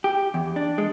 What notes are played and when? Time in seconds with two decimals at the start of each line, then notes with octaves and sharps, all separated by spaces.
0.04 G4
0.34 E2
0.56 D4
0.78 G#3